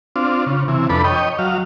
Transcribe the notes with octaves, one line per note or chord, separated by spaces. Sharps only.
C4 D4 F4
C#3
C3 E3
F2 D4 A4 B4 B5
C#5 D#5 G5
F#3 F5